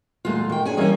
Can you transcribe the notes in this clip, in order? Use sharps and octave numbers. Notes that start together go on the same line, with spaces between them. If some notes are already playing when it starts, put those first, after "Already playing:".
E2 A#2 G#3 A3 F4
D#3 G5
C#4 D4 G#4 G#5
E3 G3 A#3 C#4 D#5